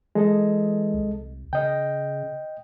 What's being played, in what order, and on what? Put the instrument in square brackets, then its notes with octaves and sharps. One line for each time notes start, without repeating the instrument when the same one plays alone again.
[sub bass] E3 [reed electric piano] G#3 A4 D#5
[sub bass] C2
[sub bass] C#3 [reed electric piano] D#5 G5